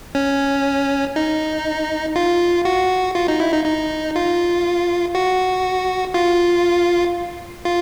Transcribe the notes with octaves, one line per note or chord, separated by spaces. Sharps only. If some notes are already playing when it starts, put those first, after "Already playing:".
C#4
D#4
F4
F#4
F4
D#4
E4
D#4
D#4
F4
F#4
F4
F4